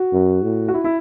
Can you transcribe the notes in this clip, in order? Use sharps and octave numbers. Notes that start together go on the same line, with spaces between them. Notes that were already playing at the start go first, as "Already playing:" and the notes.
Already playing: F#4
F#2
A2
F#4
E4
E4